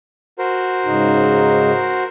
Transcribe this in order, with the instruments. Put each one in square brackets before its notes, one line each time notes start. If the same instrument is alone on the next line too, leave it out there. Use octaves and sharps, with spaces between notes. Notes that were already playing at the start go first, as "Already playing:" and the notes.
[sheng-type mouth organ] F#4 A#4 C5
[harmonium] G#2 C#3 D#4